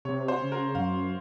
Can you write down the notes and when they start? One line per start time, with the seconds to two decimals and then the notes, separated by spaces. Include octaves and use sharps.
0.05 C3 C#5
0.28 C5
0.40 C#3
0.52 A#4
0.75 F#2 F5